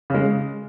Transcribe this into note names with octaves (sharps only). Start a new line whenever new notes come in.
C#3 G#3